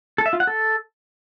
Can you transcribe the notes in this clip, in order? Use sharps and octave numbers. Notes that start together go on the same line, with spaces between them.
A4
E5
F4
F#5
A4